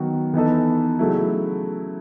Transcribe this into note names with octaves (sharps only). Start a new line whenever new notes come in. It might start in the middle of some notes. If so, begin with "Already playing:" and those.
Already playing: D#3 F#3 B3 F#4
E3 B3 D#4 A4
C#3 F#3 A3 E4